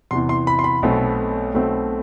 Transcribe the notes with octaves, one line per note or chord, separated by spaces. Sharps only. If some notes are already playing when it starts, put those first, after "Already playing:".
E2 C3 E3 C6
C6
B5
C6
B5
B1 B2 A3 C4
B1 B2 A3 C4